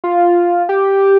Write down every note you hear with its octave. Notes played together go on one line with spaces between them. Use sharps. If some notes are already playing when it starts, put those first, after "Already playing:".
F4
G4